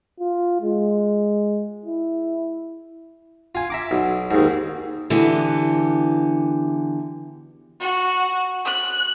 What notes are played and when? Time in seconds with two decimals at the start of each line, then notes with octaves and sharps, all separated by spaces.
0.20 F4
0.62 G#3
1.86 E4
3.55 F4 G#5
3.70 E5 A#5 D6
3.91 B1
4.31 D#2 G#2
5.10 D3 E3 B3 F#4 G4
7.79 F#4
8.64 F#6